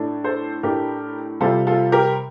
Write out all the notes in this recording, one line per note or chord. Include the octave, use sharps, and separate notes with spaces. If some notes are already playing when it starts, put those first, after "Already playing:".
Already playing: A2 A3 D4
A4 C5
A2 A3 D4 G4 A#4
C3 G3 C4 F4 A4
F4 A4
G4 A#4